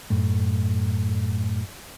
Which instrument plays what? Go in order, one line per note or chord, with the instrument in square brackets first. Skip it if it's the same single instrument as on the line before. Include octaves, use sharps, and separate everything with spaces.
[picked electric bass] F#2 A2 A3